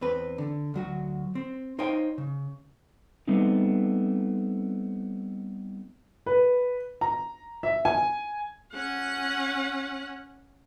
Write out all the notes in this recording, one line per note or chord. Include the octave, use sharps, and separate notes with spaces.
E2 C4 B4
D3
D2 F#3 F#4
C4
D#4 C5 C#5 D#5 F5 G5
C#3
G3 A3 B3 C4 D#4
B4
A#5
E5
G#5
C#4 F#5